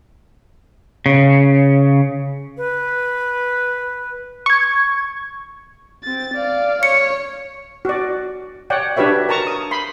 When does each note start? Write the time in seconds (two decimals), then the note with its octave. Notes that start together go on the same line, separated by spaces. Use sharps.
1.06 C#3
2.57 B4
4.46 C#6 G#6
6.03 C4 A6
6.34 D5 F5
6.83 C#5 C#7
7.85 F#4 D5
8.70 C#5 D5 F#5 G5
8.96 D4 F#4 G4 B4 C#5 E5
9.29 A#4 A5 A#5 C#6
9.47 D#6
9.71 B5 C6